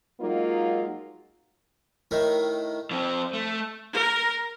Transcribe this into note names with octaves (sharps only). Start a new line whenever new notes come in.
F#3 G#3 A#3 D#4 F4
A2 D#3 A3
F3 C4
A3
A#4